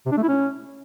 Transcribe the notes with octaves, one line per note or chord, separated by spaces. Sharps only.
C3
D4
A3
E4
C#4